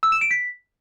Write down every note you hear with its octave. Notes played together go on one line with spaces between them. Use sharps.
E6
E7
D7
B6